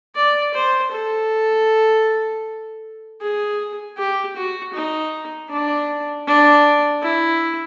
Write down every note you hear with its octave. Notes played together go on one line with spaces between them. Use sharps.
D5
C5
A4
G#4
G4
F#4
D#4
D4
D4
E4